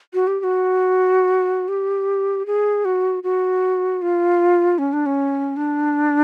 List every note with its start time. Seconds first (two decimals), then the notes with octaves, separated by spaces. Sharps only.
0.14 F#4
0.27 G4
0.40 G4
0.44 F#4
1.68 G4
2.46 G#4
2.85 F#4
3.23 F#4
4.02 F4
4.78 C#4
4.93 D4
5.06 C#4
5.57 D4